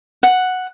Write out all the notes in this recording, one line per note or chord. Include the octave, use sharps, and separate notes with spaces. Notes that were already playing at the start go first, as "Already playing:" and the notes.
F#5